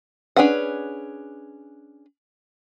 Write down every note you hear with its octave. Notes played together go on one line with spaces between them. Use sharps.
C#4 D4 G#4 B4 F#5